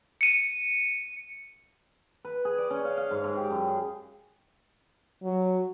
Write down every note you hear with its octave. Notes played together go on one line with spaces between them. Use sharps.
C#7 D#7
B4
G#4
D5
C#4
F5
F5
G#2
G#2
G4
F#2
G#4
F#3